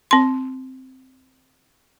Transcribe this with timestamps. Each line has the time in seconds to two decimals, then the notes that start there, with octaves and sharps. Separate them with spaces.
0.11 C4 C6